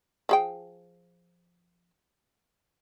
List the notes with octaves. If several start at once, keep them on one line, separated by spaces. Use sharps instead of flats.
F3 G#4 G5